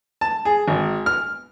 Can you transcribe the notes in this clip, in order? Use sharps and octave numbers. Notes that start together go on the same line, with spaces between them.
A5
G#4
G#1
F6